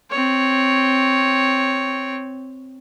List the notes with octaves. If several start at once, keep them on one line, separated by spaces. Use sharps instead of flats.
C4 C#5